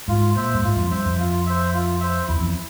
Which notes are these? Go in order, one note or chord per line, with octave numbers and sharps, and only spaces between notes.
G#2 F4
A#2 C5 E5
G2
G#2 F4
F2
G2 C5 E5
F2
F4
C5 E5
F4
C5 E5
E2 E4
F2